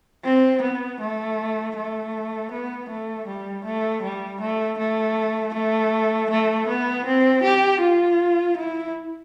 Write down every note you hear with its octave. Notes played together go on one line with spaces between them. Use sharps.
C4
B3
A3
A3
B3
A3
G3
A3
G3
A3
A3
A3
A3
B3
C4
G4
F4
E4